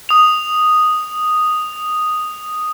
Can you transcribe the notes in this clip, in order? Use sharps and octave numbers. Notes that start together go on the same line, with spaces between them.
D#6 F7